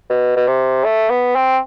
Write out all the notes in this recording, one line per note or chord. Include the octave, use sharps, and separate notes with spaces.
B2
B2
C3
A3
B3
C4